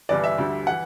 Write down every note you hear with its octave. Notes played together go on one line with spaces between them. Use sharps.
G1 G2 E3 D5
E5
D2 D3 G3
E3 F#5